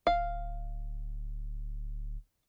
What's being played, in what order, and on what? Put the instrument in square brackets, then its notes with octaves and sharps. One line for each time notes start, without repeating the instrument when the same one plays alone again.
[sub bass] D1 [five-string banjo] F5